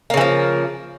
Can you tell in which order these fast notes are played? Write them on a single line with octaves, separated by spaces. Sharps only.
A#3 C#3 E3 F3